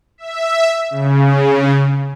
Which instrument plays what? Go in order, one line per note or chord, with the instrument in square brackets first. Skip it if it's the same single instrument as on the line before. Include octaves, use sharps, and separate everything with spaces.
[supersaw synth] E5
C#3